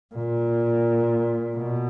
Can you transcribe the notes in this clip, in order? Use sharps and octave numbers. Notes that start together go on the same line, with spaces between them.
A#2
B2